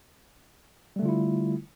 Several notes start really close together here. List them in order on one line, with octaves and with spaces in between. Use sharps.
G3 A3 D3 F4 E4